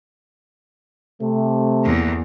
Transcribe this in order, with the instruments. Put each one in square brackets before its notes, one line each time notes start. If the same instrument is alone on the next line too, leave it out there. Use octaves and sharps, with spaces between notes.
[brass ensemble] C3 A3
[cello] E2 A#3